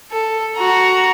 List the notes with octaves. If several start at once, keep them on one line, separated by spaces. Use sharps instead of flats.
A4
F#4 A#5